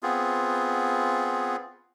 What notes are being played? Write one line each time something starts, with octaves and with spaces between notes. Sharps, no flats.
B3 C4 F4 G#4